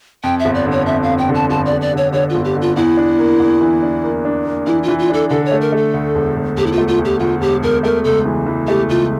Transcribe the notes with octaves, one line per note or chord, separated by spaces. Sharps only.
F2 G5
E5
G1
D5
D3
C#5
F2 E5
F5
F2
G5
D3
A5
G1 A5
D5
G1
D5
D3 C#5
D3 C#5
G1 F4
G4
D3
F4
E2 E4
D4
A#3
E2
E3
D4
A#3
D4
A#3
E3 E4
F4
E3
F4
D4 A4
D3 A4
C#5
A3
A#4
A3 A4
D2
E1
E1
E1 G4
E4
F4
A3
F4
D2
G4
D2 F4
E1 G4
E1 A#4
A3 A#4
C#2 A4
E3
E3
A3 G4
C#2 F4